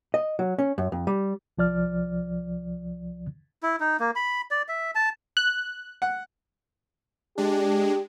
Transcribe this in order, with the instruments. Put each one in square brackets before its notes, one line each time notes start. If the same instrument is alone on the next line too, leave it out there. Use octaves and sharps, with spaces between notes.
[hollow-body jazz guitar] D#5
F#3
C#4
F#2
F2
G3
[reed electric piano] C2 F3 D5 F6
[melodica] E4
D#4
A#3
B5
D5
E5
A5
[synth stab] F#6
[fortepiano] F#5
[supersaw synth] G#3 D4 [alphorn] G4